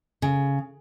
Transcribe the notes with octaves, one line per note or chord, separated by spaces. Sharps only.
C#3